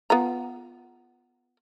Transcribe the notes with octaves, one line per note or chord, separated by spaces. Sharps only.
B3 F4 A#5